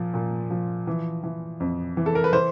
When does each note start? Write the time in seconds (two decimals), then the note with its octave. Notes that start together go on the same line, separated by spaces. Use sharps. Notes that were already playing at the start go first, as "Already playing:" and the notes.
Already playing: A#2 F3
0.14 A#2
0.50 F3
0.87 E3
1.23 E3
1.60 F2
1.97 E3
2.06 A4
2.15 A#4
2.24 B4
2.33 E3 C5